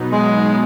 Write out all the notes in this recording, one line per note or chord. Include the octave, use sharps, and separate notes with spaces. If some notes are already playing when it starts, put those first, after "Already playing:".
Already playing: B2 F#3 B3 D#4
G#3